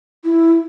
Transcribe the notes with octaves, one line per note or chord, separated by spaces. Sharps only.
E4